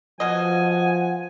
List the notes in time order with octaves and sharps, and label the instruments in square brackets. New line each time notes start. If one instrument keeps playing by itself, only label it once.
[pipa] B2 D#5 [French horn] F3 [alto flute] F#5 [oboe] G#5